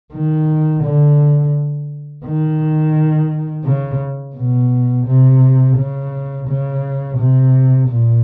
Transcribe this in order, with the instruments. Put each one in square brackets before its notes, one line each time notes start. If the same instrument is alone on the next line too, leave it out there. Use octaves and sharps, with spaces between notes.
[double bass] D#3
D3
D#3
C#3
B2
C3
C#3
C#3
C3
A#2